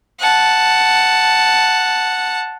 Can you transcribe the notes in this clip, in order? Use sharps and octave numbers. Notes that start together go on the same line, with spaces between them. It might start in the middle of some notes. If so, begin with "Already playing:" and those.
F#5 A5